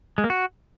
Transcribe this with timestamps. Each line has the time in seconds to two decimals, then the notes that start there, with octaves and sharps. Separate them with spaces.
0.18 G#3
0.24 A#3
0.30 F#4